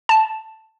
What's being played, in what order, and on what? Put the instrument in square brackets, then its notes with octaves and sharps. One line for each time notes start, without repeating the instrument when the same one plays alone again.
[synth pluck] A5